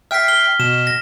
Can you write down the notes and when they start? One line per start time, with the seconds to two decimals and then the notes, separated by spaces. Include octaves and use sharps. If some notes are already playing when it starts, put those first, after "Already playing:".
0.11 E5 G5 F6 B6 C7
0.28 F6 G7
0.60 B2 E7
0.87 A#6